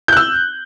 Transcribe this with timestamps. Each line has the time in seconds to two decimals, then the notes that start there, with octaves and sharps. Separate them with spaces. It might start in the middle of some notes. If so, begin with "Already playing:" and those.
0.08 G6
0.13 F#6
0.17 E6